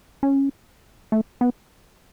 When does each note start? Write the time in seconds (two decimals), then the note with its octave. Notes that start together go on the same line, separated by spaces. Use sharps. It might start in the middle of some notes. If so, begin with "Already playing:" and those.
0.23 C#4
1.12 A3
1.41 B3